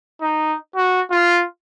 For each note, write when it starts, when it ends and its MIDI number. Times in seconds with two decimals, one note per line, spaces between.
0.21 0.56 63
0.76 1.01 66
1.11 1.44 65